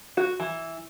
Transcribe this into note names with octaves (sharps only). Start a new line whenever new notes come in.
F#4
E3